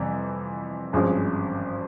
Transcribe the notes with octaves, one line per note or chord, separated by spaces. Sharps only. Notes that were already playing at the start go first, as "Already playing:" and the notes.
Already playing: F2 C3 E3 G3
G#1 G2 F3 G#3 C#4